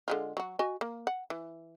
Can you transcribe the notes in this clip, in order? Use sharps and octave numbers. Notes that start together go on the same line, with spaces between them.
D3 G#3 F4
F#3 F#4
F#4 D#5 G#5
A#3
F#5
E3